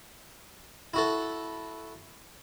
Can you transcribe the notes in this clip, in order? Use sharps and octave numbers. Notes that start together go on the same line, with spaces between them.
E4 F#4 A4